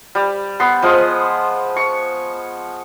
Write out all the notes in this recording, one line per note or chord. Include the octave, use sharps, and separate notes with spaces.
G3
B3 C6
F3 G#3 D#6
C#6